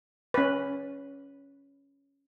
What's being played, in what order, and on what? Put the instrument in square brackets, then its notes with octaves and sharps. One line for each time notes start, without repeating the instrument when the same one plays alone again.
[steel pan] C#4 B4